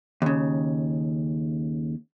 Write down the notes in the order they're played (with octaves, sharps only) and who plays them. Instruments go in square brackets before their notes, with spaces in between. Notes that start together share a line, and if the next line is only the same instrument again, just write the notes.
[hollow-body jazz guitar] D#2 C#3